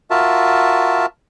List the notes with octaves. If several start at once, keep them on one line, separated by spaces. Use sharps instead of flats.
F4 F#4 A#4 E5 A5